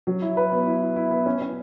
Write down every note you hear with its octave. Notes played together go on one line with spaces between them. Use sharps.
F#3
E4
B4
B3
E4
E4
E4
B3
C#4
C#4